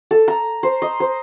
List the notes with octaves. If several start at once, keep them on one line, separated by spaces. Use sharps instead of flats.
A4
A#5
C5
D#5
C5